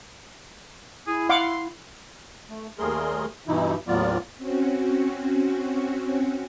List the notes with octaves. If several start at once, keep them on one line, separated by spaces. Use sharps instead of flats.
E4 G#4
F5 F#5 C6 D6
A3
D#2 G3 A3 G#4 A#4 C6
G2 B2 E3 D#4 E4
D#2 A2 F#3 B3 F4 D5
C4 C#4 F#4